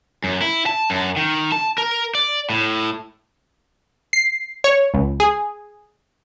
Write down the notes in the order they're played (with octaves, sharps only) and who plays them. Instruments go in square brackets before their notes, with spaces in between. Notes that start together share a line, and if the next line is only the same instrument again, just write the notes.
[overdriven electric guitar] F#2
E4
A5
F#2
D#3
A5
A#4
D5
A2
[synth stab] C7
C#5
C#2
G#4